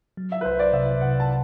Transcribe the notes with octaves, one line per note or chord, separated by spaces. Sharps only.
F#3
E5
B4
C2 C5
D5
C3 E5
C3 F#5
A5